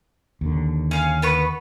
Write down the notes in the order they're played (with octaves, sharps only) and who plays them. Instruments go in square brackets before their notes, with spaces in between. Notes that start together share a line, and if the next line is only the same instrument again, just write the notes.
[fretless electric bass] D#2 D3
[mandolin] C#4 F5
B3 B4 C#6